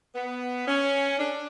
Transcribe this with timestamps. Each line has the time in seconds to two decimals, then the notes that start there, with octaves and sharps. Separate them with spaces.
0.15 B3
0.67 C#4
1.19 D4